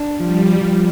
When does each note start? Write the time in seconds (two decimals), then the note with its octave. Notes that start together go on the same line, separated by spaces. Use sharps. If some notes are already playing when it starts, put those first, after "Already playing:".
Already playing: D4
0.19 F3 G3
0.61 F3